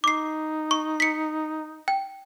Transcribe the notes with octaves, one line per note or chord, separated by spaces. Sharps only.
D#4 D6 C7
C#6
B6 C#7
G5